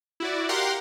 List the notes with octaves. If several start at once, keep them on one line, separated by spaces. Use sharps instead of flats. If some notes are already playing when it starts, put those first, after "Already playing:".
E4 F#4 D5
G4 A#4 F5 F#5 A#5 C6